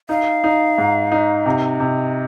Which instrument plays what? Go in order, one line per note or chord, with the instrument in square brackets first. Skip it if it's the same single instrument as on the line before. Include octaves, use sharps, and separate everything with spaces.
[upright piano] D#4 [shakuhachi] F5
[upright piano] D#4
G#2
D#4
C3
C3